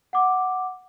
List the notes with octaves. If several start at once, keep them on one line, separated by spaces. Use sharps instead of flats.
F#5 D6